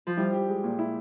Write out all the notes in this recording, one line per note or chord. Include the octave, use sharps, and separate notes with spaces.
F3
G3 E4
G4
G#3
A#2
E4